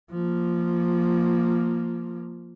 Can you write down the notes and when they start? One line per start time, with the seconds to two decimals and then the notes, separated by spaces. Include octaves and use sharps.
0.11 F3 A#3